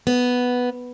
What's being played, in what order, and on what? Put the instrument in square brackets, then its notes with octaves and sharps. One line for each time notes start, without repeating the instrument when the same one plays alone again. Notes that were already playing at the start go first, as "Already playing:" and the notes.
[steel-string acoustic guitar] B3